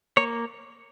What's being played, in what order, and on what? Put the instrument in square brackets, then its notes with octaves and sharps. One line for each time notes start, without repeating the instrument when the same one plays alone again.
[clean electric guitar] A#3 C#5